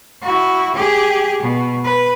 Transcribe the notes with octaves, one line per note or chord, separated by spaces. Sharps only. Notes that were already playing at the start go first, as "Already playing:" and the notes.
E4 F#4
G4 G#4
B2
B4